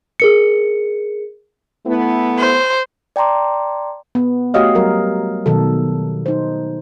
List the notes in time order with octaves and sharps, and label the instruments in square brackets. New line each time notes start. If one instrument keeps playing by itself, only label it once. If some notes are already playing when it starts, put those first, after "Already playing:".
[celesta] G#4 A#4 C#7
[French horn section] A3 B3 E4
[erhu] C5
[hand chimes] D5 G5 A5 A#5 C6 D6
[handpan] B3
A3 F#4 G4 C#5 D#5 F5
F#3 G3 A#4
B2 D#3 F#3 A4
D#4 C5